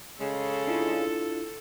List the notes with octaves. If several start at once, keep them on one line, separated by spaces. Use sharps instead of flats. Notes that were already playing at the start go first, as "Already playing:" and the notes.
C#3 G#3 A4
D4 E4 F4